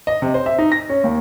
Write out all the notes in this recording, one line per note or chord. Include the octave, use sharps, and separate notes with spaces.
D#5
C3
C5
E5
D#4
A#6
C#4
D#2